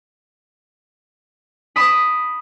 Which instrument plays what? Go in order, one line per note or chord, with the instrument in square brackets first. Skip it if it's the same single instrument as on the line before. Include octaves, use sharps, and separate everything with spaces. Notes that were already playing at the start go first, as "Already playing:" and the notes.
[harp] B5 D#6 D7 E7